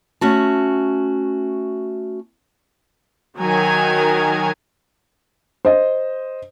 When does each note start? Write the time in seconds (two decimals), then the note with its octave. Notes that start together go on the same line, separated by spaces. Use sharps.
0.21 A3 C#4 F#4 A5
3.38 D#3 F#3 A#4 G#5 A#5
5.65 C5 D#5